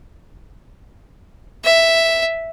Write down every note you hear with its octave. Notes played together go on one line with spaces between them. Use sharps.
E5